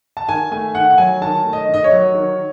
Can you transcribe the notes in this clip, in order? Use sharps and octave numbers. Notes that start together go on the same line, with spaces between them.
A5
D#3 G#5
A3 G#5
D#3 F#5
F#5
F#3 G#5
D#3 A5
A3
D#5
D#3
D#5
C#5
F#3
D#3